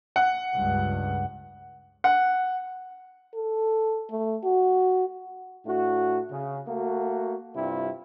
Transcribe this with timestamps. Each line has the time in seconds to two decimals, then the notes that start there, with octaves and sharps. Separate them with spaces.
0.16 F#5
0.53 C#2 G2
2.04 F#5
3.34 A4
4.10 A3
4.44 F#4
5.66 A2 A3 D4 F#4
6.31 C#3
6.67 A3 A#3 F#4
7.55 G2 C3 G3 E4 F4